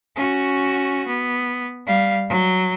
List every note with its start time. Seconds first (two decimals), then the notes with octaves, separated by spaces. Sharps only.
0.16 C#4 F#4
1.08 B3
1.86 G3 F5
2.29 F#3